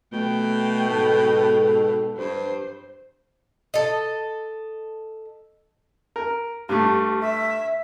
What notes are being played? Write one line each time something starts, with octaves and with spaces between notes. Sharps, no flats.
B2 A3 G5
G#2 A4
G2 C5
A4 D#5
A#4
G2 A3 G4
E5